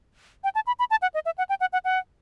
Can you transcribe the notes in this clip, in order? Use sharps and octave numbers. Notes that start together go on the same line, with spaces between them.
G5
A5
B5
B5
A5
F#5
D#5
E5
F#5
G5
F#5
F#5
F#5